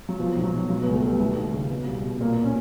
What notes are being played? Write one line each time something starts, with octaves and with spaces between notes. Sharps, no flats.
F#3
B2 F3
B1
F#3
B2
B2 F#3
B3
C#2
A3
B2
G3
D#2 A3
D#2
C#3
B2
C2
B2
A#2 A#3
C#4